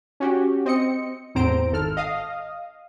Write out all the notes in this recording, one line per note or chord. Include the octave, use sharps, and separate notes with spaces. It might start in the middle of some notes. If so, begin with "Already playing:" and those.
C#4 F#4 G4
C4 D#5 C#7
E2 A2 C4 C5 A#5 D7
G#1 A4 F6
D#5 F5 D#6